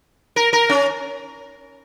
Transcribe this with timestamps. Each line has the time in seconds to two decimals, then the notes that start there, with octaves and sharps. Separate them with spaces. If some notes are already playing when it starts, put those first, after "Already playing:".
0.36 A#4
0.53 A#4
0.69 C#4